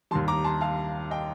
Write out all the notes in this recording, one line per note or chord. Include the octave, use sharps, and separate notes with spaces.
D#2 D#3 G3 A5 C6
A#5 D6
A5 C6
F5 A5
D#5 G5